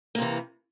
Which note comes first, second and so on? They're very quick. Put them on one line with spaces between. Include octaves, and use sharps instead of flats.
A#3 C3 E3